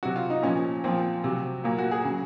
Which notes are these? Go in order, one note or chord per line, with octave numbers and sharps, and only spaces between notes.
C3 F#3 F#4
F4
D#4
A#2 F3 C#4
A#2 F3 C4
C3 F#3
A#2 F#3 A#3
F#4
G#4
C#3 F#3